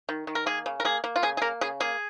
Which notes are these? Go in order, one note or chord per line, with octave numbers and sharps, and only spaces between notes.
D#3
D#3
A#4
A#3 G#4
C#3
A#4
A#3 G#4
A#3
F4
C#3 G#4
G#4
A#3 A#4
C#3 G#4
A#3 G#4